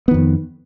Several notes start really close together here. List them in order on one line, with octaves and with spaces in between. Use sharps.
B3 D#3 F2